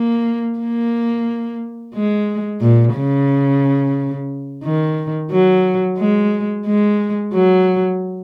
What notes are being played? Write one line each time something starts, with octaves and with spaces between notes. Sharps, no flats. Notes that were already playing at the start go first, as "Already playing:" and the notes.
Already playing: A#3
A#3
G#3
A#2
C#3
D#3
F#3
G#3
G#3
F#3